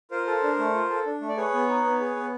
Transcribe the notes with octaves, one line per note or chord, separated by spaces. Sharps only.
F4 A#4 C5
A4
D4
A3
F4
A4
D4
A3
D5
G#4 B4 C#5
B3
D#4
B3
G#4
B3